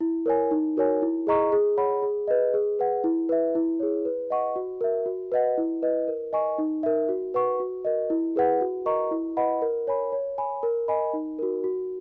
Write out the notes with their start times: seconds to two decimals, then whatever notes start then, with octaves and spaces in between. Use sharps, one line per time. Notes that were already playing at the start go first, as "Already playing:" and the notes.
0.01 E4
0.26 A#4 C#5 G#5
0.51 D#4
0.77 F#4 A#4 C#5 G#5
1.02 E4
1.27 G#4 D#5 A#5 C#6
1.52 G#4
1.77 C#5 F#5 B5
2.03 G#4
2.28 B4 D#5
2.54 G#4
2.79 B4 F#5
3.04 E4
3.29 B4 E5
3.55 E4
3.80 G#4 C#5
4.05 B4
4.30 D#5 F#5 C#6
4.56 F#4
4.81 A#4 E5
5.06 F#4
5.32 B4 D#5 F#5
5.58 E4
5.83 B4 D#5
6.08 A#4
6.33 D#5 G#5 C#6
6.58 D#4
6.83 A#4 E5
7.09 F#4
7.34 B4 F#5 C#6
7.60 F#4
7.85 A#4 D#5
8.10 E4
8.36 G#4 B4 F#5
8.61 F#4
8.86 A#4 D#5 A#5 C#6
9.11 E4
9.37 B4 D#5 F#5 B5
9.62 A#4
9.87 C#5 G#5 B5
10.12 C#5
10.38 G#5 B5
10.63 A#4
10.88 D#5 G#5 B5
11.13 D#4
11.39 F#4 A#4
11.64 F#4